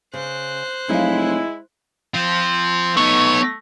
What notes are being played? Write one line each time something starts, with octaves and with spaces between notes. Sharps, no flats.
C#3 C5 F#6
F1 F#3 G#3 E4 F5
F3 C4 F4
A3 B3 D#4 C#5